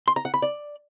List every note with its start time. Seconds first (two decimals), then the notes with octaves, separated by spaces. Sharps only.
0.08 C6
0.16 A#5
0.25 F#5
0.34 B5
0.42 D5